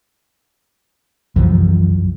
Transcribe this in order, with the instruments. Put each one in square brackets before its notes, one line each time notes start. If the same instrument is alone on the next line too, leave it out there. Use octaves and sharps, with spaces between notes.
[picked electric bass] C2 [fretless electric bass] F#2 E3 F3